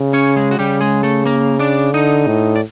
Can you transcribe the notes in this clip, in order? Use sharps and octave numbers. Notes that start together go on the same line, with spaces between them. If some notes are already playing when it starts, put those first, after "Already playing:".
Already playing: C#3
C#4 C#5
G#3 G#4
F#4
C#3 G3 G4
G#3 G#4
A3 A4
A#3 A#4
D4 D5
D3 D#4 D#5
A2
D5